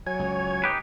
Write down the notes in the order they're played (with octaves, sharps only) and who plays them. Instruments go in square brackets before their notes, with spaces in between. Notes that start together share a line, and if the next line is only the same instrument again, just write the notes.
[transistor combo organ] F#3 G#5 [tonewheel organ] C#5
[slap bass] C#2
[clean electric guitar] D#4 G4 B4